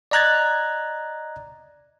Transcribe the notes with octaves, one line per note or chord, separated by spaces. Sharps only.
D5 D#5 A#5 F#6 G#6 A6